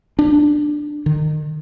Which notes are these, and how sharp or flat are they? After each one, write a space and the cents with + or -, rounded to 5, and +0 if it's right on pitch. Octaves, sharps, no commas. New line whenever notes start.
D4 +15
D#3 -30